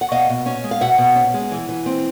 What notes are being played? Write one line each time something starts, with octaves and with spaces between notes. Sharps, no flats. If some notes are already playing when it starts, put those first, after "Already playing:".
F#5
B2 D#5 F5
B2
C#4
G#3
F5
B2 E5 F#5
B2
C#4
G#3
E3
E3
C4